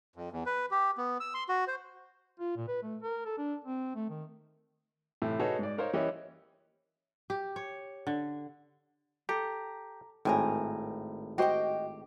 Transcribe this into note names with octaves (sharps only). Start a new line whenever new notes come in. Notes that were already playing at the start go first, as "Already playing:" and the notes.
F2
E2
B4
G4
B3
E6
C6
F#4
C5
F4
A#2
B4
A3
A#4
A4
D4
C4
A3
D#3
A2 C3 E3
D#4 F#4 G#4 A4 B4 C#5
G#2 D5
D#4 A#4 C5 C#5 F5
E3 A#3 C#4 G4 C#5 D#5
G4
C#5
D3
G4 A4 A#5
G#1 A2 G5 G#5 A#5
F#4 G4 C5 D#5 G5